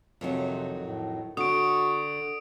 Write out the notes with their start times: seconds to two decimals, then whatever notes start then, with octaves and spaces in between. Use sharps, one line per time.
0.21 F2 C3 D#3 F#3
0.82 A2
1.37 D3 F#4 D#6 D7